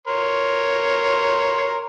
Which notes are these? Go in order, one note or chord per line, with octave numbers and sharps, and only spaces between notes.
A#4 C#5 C6